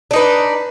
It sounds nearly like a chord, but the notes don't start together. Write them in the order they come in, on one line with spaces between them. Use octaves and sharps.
D4 D#4 B4